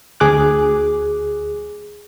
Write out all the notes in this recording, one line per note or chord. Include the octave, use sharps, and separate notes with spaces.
D2 G#4 D6 F#6